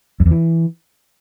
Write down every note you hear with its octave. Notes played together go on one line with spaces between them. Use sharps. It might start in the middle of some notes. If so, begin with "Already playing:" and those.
F2
E2
E3